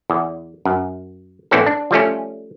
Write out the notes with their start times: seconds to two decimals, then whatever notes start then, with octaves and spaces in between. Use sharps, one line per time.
0.10 E2
0.65 F#2
1.51 E2 A2 E3 C4 C#4 A4
1.66 D4
1.91 F3 G3 A3 C#4